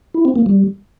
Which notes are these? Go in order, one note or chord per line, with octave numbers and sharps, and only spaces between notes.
E4
C4
A#3
G3